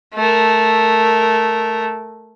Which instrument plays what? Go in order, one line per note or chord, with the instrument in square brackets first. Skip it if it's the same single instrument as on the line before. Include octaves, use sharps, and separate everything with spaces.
[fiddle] A3 A#4